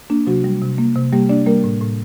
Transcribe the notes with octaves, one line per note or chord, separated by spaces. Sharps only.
A#3 D4
C3 F#3 F#4
G3
C3
A#3
C3
G3 A#3 G4
A#3 D4 D5
G3 A#3 A#4
A2
A2